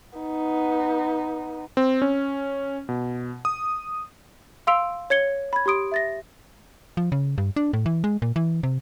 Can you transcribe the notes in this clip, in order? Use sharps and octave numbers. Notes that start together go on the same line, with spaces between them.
B3 D#4
C4
C#4
B2
D#6
F5 C6 E6 D7 F7
C#5 G#6 C#7 G7
B5 G#6
G4 C6 D#6 D7
E5 A6 A#6
F3
C#3
G2
D4
A2
E3
G#3
A#2
E3
C3